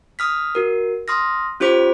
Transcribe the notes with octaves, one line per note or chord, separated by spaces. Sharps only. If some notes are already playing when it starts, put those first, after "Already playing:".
D#6 F6 B6
F#4 A#4
C6 D#6 F6 A#6
C#4 F4 G4 C5 D6 B6